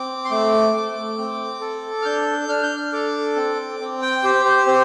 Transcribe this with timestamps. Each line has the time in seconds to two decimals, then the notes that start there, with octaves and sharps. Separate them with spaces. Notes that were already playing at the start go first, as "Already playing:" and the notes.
Already playing: C4 D6
0.25 C6
0.31 A3 D6
0.74 A3
1.18 C4
1.61 A4
2.02 F6
2.05 D4 G6
2.49 D4 F6
2.63 G6
2.77 F6
2.93 A4 D6
3.36 C4
3.80 C4
4.02 G5
4.23 G4 C5
4.45 C5
4.67 C4 C5